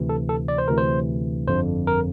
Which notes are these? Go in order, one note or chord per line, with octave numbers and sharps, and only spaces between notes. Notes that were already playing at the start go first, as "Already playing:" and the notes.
Already playing: D2 C3 E3
A4
A4
D5
C5
D2 C3 E3 A#4
C5
G1 F2 D3 C5
A#4